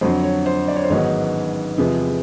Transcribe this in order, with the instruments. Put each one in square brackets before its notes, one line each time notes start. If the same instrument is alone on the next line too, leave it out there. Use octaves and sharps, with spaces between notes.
[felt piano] F2 D3 F#3 C5
C#5
C5
D5
C#5
C5
A1 G#2 D#3 F#3 B3 C#5
E2 C3 F3 G#3 B3